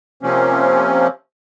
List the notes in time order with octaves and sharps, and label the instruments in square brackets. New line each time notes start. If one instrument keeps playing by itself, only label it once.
[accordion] C3 F3 A#3 C4 C#4